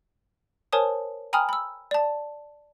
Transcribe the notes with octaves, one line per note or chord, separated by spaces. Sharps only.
A#4 C5 C#5 G#5 A5 D#6
G5 G#5 A#5 B5 D#6 F6
B5 E6
D5 A5